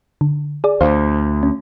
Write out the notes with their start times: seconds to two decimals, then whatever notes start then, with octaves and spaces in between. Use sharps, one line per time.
0.21 D3
0.64 G#4 D5
0.81 D2 C5 F5
1.43 C#4